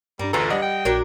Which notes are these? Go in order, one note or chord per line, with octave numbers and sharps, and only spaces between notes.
G2 G3 D4 A#4
A1 D2 F4 G#4 A4 B4 A#5 G#6
G3 D4 D#5 F#5
G5
A#1 F#3 D4 A#4